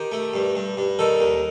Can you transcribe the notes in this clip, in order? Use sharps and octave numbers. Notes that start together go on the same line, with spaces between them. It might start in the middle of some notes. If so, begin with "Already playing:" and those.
Already playing: D#3 G4
A3
G2
G2
G2
D#3 A4
D#2